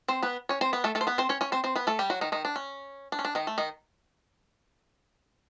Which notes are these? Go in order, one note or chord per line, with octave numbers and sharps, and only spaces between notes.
C4 C5
B3 B4
C#4 C#5
C4 C5
B3 B4
A3 A4
A3 A4
C5
B3 B4
C4 C5
C#4 C#5
C#4 C#5
C4 C5
C4 C5
B3 B4
A3 A4
G3 G4
F#3 F#4
D#3 D#4
D#3 D#4
D4
C#4
D4
C#4
D4
D#3 D#4
A3
D#3 D#4